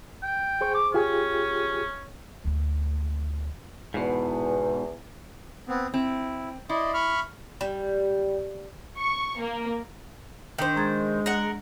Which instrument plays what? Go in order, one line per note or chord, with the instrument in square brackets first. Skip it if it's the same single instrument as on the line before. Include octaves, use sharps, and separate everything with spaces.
[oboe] G5
[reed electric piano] G#4 C5 C#6
[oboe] D6
[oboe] C#4 [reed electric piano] F4 G4 G#4
[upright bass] D2 A3
[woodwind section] E2 [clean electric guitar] G#2 B2
[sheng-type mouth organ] B3 C4
[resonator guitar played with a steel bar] C4 [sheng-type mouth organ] E4
[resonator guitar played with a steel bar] E4 [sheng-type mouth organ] D5 D#5 C6
[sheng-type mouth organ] B5 C#6 F6
[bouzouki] G3
[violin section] C#6
A#3
[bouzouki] D#3 C5 [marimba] D4 G5
[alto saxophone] G#3 [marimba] A#5 G#6 A6
[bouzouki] A#4 F#5